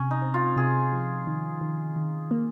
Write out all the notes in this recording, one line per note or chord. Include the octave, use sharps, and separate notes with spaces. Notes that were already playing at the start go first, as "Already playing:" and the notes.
Already playing: C3 C#4
D#4
C4
F4
C3 G#4
F3
D#3
D#3
D#3
A#3